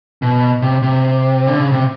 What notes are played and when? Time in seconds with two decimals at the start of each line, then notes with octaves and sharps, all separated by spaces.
0.22 B2
0.62 C3
0.82 C3
1.47 D3
1.60 C#3
1.72 C3